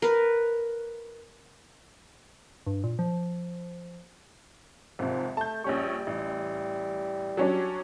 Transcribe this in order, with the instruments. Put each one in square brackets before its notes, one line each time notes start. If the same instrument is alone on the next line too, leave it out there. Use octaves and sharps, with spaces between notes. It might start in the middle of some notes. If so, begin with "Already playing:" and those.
[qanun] A#4 B4
[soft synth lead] G2
A#2
F3
[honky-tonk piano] G#1 C3 [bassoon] F3
[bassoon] A3 [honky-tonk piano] A5 G6
[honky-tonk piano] A#1 C#4 C#6 [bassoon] G3
[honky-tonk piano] A1
F#3 C#4 D4